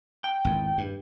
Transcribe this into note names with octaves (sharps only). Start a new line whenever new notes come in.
G5
G#1 E2
G2